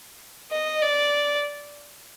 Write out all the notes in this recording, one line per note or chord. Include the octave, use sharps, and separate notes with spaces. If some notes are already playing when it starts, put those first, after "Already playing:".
D#5
D5